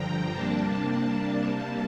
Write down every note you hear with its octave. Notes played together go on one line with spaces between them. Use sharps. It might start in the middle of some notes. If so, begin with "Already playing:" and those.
Already playing: G2 D3 F3 G5 A#5
C3 G3 A#3 D4 A5
C3 G3 A#3